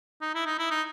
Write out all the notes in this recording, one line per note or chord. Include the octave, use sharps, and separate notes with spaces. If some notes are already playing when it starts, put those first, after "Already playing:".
D#4
E4
D#4
E4
D#4